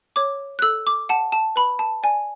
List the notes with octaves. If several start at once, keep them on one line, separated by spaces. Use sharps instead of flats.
C#5 D6
F#6
A4 E6
D6
F#5 A5
A5
B4 B5
A5
D5 G#5